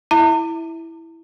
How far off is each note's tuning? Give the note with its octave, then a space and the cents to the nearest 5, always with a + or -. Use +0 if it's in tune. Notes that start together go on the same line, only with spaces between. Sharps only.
E4 +0 E5 -15 A#5 -45